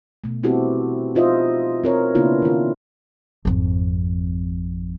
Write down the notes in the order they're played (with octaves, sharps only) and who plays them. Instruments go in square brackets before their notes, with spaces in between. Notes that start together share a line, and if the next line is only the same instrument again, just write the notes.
[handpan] B2 A3
B3 C4 E4 F#4 G4 A4
D#4 F4 C5 D#5 E5
C4 A#4 C#5
C#3 A#3 B3 D4 E4 F4
D#3 F4
[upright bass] G#1 F2